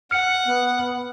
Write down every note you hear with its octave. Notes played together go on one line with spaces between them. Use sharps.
F#5 F6 C#7
B3